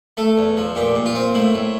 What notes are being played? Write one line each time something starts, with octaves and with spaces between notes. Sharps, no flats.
A3 A4
E2
F3
A#2 G4
A#2
F4
C4
A2 E4
A2